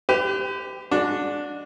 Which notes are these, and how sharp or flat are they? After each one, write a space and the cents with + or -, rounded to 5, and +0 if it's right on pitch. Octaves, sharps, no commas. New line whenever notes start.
G4 +0 B4 +40
G#3 +0 D4 +0 F#4 -30